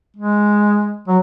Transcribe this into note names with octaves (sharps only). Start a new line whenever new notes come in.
G#3
F#3